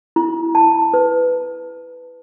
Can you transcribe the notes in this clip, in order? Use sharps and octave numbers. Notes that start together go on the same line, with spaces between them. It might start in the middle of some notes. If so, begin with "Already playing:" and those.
E4
A5
B4